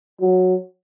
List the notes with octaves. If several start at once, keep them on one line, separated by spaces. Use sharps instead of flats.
F#3